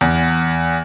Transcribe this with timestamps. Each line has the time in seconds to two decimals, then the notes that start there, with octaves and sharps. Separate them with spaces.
0.01 E2